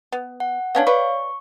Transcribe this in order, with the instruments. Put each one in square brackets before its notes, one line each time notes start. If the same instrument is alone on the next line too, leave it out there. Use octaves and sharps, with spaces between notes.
[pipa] B3
[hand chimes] F#5
[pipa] B3 C#4 D4 [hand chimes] C#5 F5
[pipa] B4 D5 [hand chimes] C#6